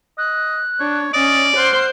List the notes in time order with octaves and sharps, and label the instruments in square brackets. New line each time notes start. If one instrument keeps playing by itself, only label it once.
[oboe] D#5 [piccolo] F#6
[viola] D4 [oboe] C#5
[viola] C#4 [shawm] D5 [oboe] D#5 [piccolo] A6
[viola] C5 C6 [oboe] F#5 [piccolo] F6